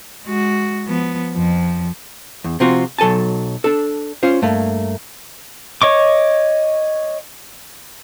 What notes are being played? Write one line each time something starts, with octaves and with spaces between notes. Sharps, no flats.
G#3 F#4
F3 B3
F2 F3
E2
C3 F3 C4 F4 F#4
B1 F#3 A4 G#5 A5
D4 A4
C#4 F4 C5
G2 A3 A#3
C#5 D#5 C#6 D6